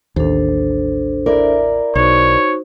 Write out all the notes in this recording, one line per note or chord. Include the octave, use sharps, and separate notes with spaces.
A1 D#2 D4 A4 C5
E4 A#4 D5
B1 D#4 F#4 C5 C#5